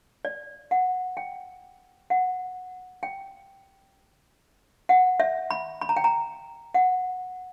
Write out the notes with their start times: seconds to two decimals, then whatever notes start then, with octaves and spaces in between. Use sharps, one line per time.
0.25 D5
0.71 F#5
1.17 G5
2.10 F#5
3.03 G5
4.89 F#5
5.20 E5
5.51 B5
5.81 B5
5.89 A#5
5.96 G5
6.04 A#5
6.74 F#5